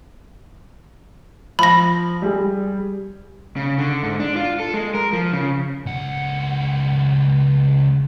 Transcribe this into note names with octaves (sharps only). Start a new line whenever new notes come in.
F3 B5 A#6
G3 G#4
C#3
D3
G#2
D4
F4
A4
G#3
A#4
F3
C#3
C#2 F#5